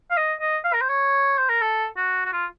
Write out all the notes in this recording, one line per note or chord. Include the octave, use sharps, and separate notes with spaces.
F5
D#5
D#5
F5
A#4
C5
C#5
C5
A#4
A4
F#4
F#4
F4